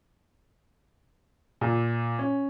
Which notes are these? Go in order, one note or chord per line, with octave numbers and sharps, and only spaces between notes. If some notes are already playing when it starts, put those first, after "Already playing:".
A#2
C#4